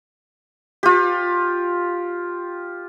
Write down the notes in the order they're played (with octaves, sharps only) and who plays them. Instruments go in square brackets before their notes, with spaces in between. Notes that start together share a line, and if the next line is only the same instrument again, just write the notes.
[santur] F4 G4